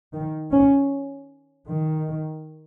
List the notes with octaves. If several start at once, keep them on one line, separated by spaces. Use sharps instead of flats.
D#3
C#4
D#3